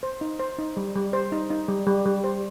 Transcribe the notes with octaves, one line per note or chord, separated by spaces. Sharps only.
C5
D#4
C5
D#4
G3
G3
C5
D#4
D#4
G3
G3
G3
C5